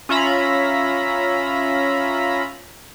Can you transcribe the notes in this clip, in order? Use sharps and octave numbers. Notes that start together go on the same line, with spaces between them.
C#4 F4 E5 A#5 B5